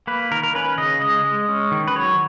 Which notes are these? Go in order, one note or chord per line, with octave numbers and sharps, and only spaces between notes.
A#3 B4
D#3 A#4
A#4
C#4 B4
C#3 D#5
G#3 D#5
G#3
C#4
D#3
B4
F#3 C#5